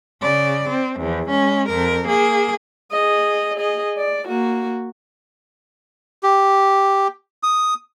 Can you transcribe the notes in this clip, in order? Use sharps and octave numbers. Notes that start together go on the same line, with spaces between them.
C#3 D5
C4
E2 F3
G#3 C#4
F2 A#4
A#3 G#4
G#4 D#5
G#4 D#5
D5
A#3 F#4
G4
D#6